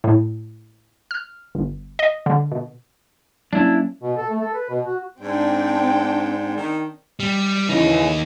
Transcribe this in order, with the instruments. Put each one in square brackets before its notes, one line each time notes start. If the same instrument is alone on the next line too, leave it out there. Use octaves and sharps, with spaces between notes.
[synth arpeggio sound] A2
F6
G1
D#5
D3
B2
[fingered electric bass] F#3 A#3 C#4 [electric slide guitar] D4 E4
[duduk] B2
A4
A3
A4
B4
B2
F#4
[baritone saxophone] G#2 [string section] C4 D4 G5
[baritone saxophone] D#3
[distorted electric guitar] G3
[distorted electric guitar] D#2 D#4 [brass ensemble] C#3 E3